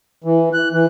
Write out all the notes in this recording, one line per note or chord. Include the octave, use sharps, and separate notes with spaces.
E3
F#6
E3